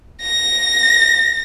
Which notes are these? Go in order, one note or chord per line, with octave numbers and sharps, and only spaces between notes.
A#6